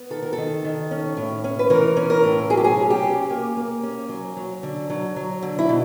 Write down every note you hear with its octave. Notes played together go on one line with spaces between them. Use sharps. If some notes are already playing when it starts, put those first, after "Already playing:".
Already playing: B3
D#3 A4
A#4
A4
D#3
D#3
C#4
A2
C#4
B4
E3 A#4
C#4
A#4
A2
F#3 G#4
G4
G#4
C#4
G4
C#4
A#3
A#3
C#4
F#3
F#3
D3
F#3
F#3
D3
E4
B2